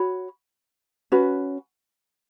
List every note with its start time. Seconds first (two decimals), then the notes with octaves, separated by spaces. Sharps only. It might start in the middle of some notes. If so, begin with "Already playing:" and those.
Already playing: F#4 C#5 B5
1.12 C#4 F#4 B4